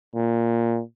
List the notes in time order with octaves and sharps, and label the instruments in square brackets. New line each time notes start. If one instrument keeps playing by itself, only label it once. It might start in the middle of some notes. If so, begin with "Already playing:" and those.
[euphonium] A#2